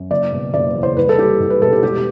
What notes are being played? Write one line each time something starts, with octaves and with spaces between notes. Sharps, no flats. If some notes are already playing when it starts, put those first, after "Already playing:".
Already playing: F#2
F#1 D5
B2
F#1 D5
E2
C5
C2 B4
A4
G3 G4
C2
B4
B2 A4
G4
E1 G4